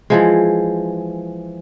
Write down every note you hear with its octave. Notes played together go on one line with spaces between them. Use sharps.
E3 F3 G#3